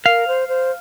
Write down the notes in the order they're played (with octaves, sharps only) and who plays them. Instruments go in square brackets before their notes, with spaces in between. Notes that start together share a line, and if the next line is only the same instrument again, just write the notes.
[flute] A#4 [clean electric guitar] F5
[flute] C5
C5